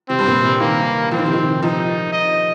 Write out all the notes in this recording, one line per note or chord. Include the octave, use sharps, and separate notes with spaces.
C3 C4
G2
A#2
C3
D#3 A#3
F3 C4
D#3
C3
D#3
F3 D#4
D#5